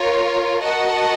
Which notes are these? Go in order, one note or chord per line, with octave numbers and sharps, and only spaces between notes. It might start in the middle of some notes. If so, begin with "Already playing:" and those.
Already playing: F4 A#4 C#5
F#4 A#4 D#5 F#5 A5